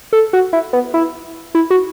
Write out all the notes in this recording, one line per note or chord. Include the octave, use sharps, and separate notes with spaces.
A4
F#4
E4
B3
E4
E4
F#4